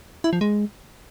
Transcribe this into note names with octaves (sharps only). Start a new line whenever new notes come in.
E4
F3
G#3